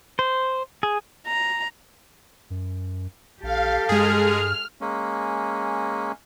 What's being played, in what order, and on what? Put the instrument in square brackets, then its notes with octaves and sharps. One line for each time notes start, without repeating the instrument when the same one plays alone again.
[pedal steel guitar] C5
G#4
[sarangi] A#5
[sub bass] F#2
[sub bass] A#1 [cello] G4 A4 [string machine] F5
[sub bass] G2 [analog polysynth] G#3 G#4 [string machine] F6
[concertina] G#3 A#3 C#4